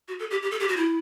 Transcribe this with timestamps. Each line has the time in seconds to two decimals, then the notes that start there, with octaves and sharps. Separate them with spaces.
0.08 F#4
0.19 A4
0.31 G4
0.42 G4
0.51 A4
0.60 G4
0.68 F#4
0.77 E4